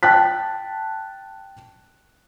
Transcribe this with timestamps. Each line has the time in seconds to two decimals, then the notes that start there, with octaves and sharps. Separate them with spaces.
0.03 G5 A5 F#6 B6